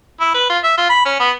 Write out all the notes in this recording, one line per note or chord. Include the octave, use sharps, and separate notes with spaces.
E4
B4
F4
E5
F4
B5
C#4
B3